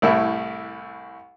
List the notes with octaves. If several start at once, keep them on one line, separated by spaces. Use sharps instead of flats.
C2 A2 E4